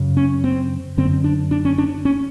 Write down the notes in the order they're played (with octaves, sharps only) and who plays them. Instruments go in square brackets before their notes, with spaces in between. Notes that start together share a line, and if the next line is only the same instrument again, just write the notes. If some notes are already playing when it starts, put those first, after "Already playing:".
Already playing: [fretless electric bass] F#2 C#3
C#4
C4
F#2 D3 C4
D4
D4
C#4
D4
C#4